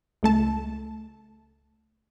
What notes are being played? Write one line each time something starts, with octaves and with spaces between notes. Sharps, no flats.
C#2 A3 A5